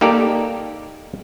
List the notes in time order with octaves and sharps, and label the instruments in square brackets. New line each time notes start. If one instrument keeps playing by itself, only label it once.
[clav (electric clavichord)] A#3 D#4 G4 A4 A#4 D5